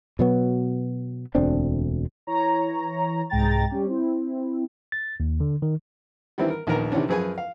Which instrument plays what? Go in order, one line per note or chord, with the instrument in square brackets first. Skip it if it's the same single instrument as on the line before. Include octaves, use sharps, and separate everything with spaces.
[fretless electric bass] B2 F#3 B3
E1 D2 C4 D4
[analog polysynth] E3 C#5 A#5
C2 G#2 G#3 G5 A#5 A6
G3 C#4 G4
C4 E4
[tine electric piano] A6
D#2
D3
D#3
[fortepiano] D#3 E3 G3 C4 D4 E4
A#4
A#1 D#2 D#3 B3 A#4 A#5
C3 D#3 E3 C#4 D4
F#2 F3 G#4 B4 G#5
F5